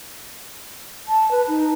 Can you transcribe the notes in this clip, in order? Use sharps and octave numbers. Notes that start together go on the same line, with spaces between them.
A5
B4
D#4